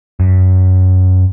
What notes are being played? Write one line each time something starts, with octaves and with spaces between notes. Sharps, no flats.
F#2